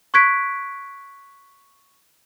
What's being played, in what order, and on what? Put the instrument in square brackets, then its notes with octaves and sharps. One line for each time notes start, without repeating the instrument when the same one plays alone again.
[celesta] C#6 F#6 G#6 B6 D7